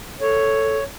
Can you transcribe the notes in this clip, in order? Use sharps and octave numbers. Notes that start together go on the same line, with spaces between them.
A4 C#5